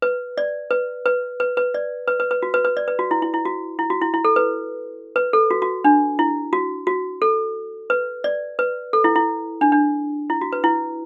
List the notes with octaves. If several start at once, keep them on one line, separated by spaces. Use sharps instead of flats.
B4
D5
B4
B4
B4
B4
D5
B4
B4
B4
F#4
B4
B4
D5
B4
F#4
E4
E4
E4
F#4
E4
F#4
E4
E4
A4
B4
B4
A4
F#4
F#4
D4
E4
F#4
F#4
A4
B4
D5
B4
A4
E4
E4
D4
D4
E4
F#4
B4
E4